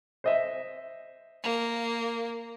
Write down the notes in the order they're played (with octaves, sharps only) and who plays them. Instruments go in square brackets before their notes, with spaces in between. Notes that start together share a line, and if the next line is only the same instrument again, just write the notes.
[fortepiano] C5 D#5 E5
[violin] A#3